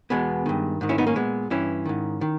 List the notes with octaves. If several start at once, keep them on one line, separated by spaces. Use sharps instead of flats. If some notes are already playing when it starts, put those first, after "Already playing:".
E2 B2 G#3 B3
G2 D#3
G#2 D#3
C#4 E4
B3 D#4
A#3 C#4
A#2 G#3 B3
G2 E3 C#4 E4
G#2 D#3
D#3